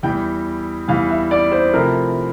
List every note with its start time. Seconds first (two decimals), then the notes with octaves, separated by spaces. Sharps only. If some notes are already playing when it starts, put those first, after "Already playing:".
0.03 E2 E3 G3 G5
0.88 E2 E3 G3 F5
1.10 E5
1.31 D5
1.52 C5
1.73 C3 F3 A3 E4 A#4